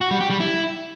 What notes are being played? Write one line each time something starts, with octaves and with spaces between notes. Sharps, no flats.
F#4
G3
G4
G3
E4